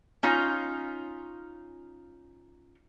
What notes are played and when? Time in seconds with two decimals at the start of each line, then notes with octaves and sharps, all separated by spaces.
0.23 C#4 D#4 F4